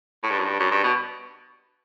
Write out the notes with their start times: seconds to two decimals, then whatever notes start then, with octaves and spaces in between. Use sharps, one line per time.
0.24 A2
0.31 G2
0.39 F#2
0.45 G2
0.60 F#2
0.71 G2
0.83 B2